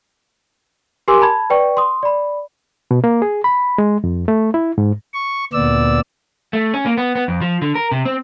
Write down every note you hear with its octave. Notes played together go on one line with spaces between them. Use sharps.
G4 A#4 G#5 C6 D6 E6
A5 B5 G#6
B4 D5 G5 C#6
C6 D#6
D5 B5
B2
A#3
G#4
B5
G#3
F2
A3
E4
G#2
C#6
D2 A#2 B3 D5 E6
A3
C#4
A#3
B3
B3
F2
F3
D3
A#4
C3
C4